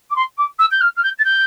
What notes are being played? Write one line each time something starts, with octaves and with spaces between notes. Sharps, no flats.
D6
C6
D6
E6
G6
F6
F6
G6
A6
G6